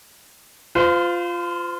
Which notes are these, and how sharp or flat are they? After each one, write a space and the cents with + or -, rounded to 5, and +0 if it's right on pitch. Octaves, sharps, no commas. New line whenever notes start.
F4 +0 C5 -40